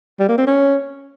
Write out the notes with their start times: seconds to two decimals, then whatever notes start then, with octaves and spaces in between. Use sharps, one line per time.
0.19 G3
0.29 A#3
0.38 C4
0.47 C#4